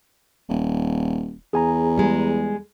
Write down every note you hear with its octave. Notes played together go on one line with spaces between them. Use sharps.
D#1
E2 G#4 G#5 A#5
G3 G#3